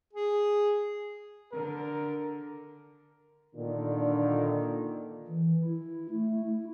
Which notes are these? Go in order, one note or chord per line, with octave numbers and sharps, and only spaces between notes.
G#4
D3 A#4
A#2 D3 D#3
E3
E4
A3
E4